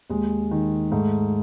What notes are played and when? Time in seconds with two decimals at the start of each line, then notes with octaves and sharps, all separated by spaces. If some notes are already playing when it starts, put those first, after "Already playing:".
0.10 D#2 G#3
0.51 D#3
0.92 G#2 A3